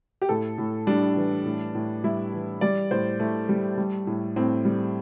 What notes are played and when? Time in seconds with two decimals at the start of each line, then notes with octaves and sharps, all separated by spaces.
0.22 G4
0.29 A2 A4
0.58 A2
0.87 G3 D4
1.17 E3
1.46 A2
1.75 A2
2.04 G3 E4
2.33 E3
2.61 G3 D5
2.91 A2 C5
3.20 A2 A3
3.49 G3
3.78 G3
4.07 A2
4.36 A2 C4
4.65 G3